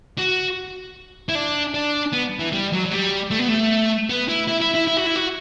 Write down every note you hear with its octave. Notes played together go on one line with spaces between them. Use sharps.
F#4
E4
D4
D4
B3
E3
G3
F#3
F#3
G3
A3
B3
A3
B3
E4
E4
E4
E4
E4
F#4
E4
F#4